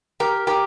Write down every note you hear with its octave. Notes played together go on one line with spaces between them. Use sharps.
G4 A#4
G4 A#4